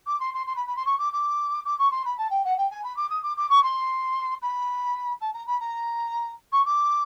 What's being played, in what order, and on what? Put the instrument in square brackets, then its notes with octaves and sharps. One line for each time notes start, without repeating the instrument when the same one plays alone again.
[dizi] D6
C6
C6
C6
B5
B5
C6
C#6
D6
D6
D6
C#6
C6
B5
A5
G5
F#5
G5
G#5
B5
D6
D#6
D6
D6
C#6
C6
B5
A5
A#5
B5
A#5
C#6
D6